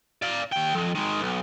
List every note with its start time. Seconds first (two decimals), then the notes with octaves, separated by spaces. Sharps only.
0.22 D5 F5
0.52 D#2 G5
0.75 F2
0.95 D#3 G#3
1.21 B1